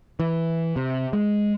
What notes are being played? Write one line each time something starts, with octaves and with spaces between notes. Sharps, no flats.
E3
C3
G#3